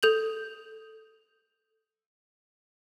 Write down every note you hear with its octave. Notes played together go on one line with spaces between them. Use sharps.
A4 G6 F#7